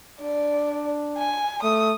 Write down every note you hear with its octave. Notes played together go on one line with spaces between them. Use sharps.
D4 D5
G#5
A3 D#6